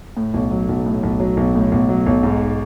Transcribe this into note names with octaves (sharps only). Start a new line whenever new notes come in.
A2
B1
F#3
B1
A2
B1
F#3
B1
A2
B1
F#3
B1
G#2